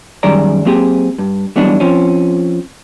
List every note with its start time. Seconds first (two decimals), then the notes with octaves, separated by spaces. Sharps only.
0.23 F#2 D#3 G3 G#3 D5 A#5
0.65 F#3 A#3 C4 G4 G#4
1.18 G2
1.56 E3 F#3 G3 B3 D4 D#4
1.80 F3 C4 C#4